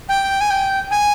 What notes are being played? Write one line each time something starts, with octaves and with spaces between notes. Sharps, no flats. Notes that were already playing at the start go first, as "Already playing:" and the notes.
G5
G#5
G5
G#5